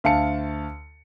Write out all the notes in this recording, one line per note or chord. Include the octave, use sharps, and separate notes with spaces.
D2 F5 A5 C#7